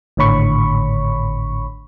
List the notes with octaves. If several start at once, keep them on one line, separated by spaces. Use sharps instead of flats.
G#1 A2 D3 C#5 B5 C#6